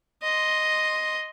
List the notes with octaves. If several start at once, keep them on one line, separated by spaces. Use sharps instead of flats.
D#5 C6